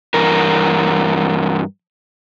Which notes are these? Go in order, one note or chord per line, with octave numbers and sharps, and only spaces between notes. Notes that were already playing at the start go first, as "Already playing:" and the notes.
G2 E3 A#4